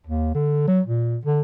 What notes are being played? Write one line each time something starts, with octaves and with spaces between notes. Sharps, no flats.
D#2
D3
F#3
A#2
D3